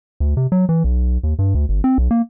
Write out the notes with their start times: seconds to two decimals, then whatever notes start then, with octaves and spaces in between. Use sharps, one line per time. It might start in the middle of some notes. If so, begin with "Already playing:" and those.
0.20 D2
0.37 C3
0.52 F#3
0.69 E3
0.84 B1
1.23 D#2
1.39 G2
1.55 D2
1.69 G1
1.84 C4
1.98 B1
2.11 A#3